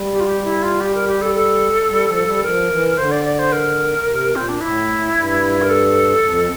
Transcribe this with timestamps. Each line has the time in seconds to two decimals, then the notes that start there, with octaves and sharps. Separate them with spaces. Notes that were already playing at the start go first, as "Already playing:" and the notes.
Already playing: G3
0.12 G4
0.20 F4
0.26 G4
0.44 E4
0.62 F4
0.81 G4
0.95 A#4
1.08 G4
1.21 A4
1.35 A4
1.89 G3
2.07 F3
2.25 G3
2.43 F3 A#4
2.70 E3
2.97 D3 C5
3.11 D5
3.25 D5
3.39 C5
3.52 A#4
4.06 C3
4.34 A#2 C4
4.49 D4
4.60 A2 E4
5.15 G2
5.62 A#4
5.69 A4
6.24 F2